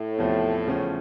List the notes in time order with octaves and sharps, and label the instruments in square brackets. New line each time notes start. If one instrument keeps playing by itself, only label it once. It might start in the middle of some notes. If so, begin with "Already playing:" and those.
Already playing: [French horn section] A2
[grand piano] E2 C3 F3 A3
E2 C#3 F3 A3 C#4